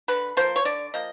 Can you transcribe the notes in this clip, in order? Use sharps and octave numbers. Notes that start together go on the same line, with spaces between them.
D3 B4
F3 A#3 C5
C#5
D3 D5
F3 A#3 D#5